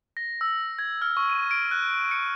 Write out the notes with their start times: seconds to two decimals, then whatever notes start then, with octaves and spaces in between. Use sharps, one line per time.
0.17 A#6
0.41 E6
0.79 G#6
1.02 F6
1.17 C#6
1.30 D#7
1.51 D7
1.71 F#6
2.11 C#7